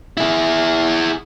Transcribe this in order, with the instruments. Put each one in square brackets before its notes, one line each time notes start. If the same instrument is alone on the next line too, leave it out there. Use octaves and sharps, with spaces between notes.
[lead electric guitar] E4 G#4